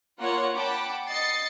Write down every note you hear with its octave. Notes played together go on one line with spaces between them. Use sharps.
A#3 F4 C#5 F#5
F#5 G5 A5 B5 D6
D#5 A6 C7 C#7